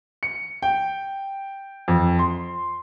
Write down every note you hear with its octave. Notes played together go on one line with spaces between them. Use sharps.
C#7
G5
F2
C6